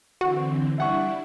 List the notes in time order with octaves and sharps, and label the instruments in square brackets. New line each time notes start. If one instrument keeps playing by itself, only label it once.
[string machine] D3 E3 C4 [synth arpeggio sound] F#4
[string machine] G3 D4 E4 [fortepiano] E5 F#5 C#6